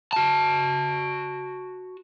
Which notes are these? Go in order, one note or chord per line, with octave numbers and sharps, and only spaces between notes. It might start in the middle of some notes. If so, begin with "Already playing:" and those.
F#4 A5